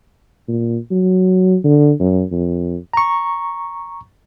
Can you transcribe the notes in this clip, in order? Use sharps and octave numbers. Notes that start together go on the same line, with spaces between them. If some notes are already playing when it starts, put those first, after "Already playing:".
A#2
F#3
D3
F#2
F2
A#5 C#6